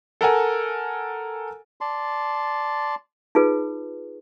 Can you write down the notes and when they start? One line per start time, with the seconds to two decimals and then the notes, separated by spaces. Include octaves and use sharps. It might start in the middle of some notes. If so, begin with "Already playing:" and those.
0.21 A4 A#4 F#5 G#5
1.81 D5 A5 C6
3.35 D#4 F4 G#4 B4